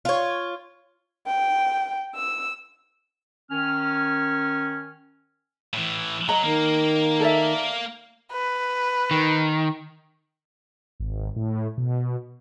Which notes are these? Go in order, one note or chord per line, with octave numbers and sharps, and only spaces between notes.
F4 C#5
G5
E6
D#3 C#4 F6
A2 E3
F#3 D#5 A#5
D#3 A#3
A4 D5 E5
B4
D#3
G#1
A2
B2